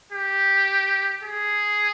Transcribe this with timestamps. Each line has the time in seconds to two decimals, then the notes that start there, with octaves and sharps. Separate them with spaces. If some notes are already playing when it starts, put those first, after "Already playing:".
0.12 G4
1.23 G#4